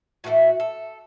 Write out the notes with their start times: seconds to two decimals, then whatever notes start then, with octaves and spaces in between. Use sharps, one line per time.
0.24 A2 E3 A3 F#4
0.60 A4